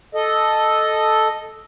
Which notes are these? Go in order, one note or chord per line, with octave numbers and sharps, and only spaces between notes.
A4 D#5